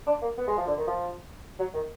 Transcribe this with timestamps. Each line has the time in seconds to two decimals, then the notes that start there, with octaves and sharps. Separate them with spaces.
0.07 D4
0.22 A#3
0.38 B3
0.48 G#3
0.57 F3
0.67 D3
0.78 D#3
0.87 F3
1.59 F#3
1.74 D#3